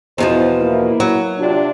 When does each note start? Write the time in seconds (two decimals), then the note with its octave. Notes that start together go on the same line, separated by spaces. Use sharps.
0.18 E2 B2 F3 E4 C5
0.57 A#3 E4
1.00 F#3
1.39 C3 D4 F4